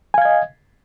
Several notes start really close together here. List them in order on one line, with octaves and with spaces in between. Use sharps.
G#5 F5 G#6 D#5